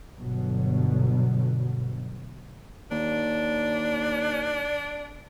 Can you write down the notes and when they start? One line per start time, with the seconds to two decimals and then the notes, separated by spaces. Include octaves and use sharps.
0.17 G1 B2 F#3
2.91 D#2 D4